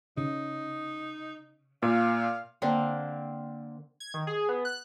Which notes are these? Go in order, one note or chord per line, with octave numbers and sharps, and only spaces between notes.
C#3 D#4
A#2 F5
D3 A#3 C4
G#6
D#3
G#4
B3
F#6